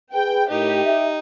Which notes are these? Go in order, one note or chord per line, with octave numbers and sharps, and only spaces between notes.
G#4 B4 G5
A2 D#4 G4 A#4
E5